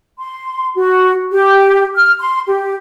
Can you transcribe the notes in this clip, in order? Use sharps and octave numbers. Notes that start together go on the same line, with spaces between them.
C6
F#4
G4
F6
C6
G4